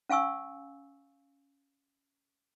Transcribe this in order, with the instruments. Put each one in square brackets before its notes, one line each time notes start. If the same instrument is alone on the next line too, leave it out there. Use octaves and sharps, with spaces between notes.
[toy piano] C#4 F5 G#5 C#6 E6